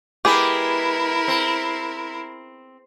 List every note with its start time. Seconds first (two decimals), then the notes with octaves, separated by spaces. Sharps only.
0.25 G#3 B3 E4 G4 G#4 A#4 B4
1.28 C4